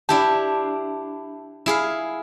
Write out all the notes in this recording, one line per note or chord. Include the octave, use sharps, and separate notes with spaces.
D4 E4 G4 A5
E4 G#4 F5